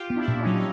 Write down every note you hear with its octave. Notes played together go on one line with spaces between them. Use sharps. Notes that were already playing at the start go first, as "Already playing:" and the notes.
Already playing: F4 G4
B3
D4 E4
A#2
C#4 D#4
F#3
D#4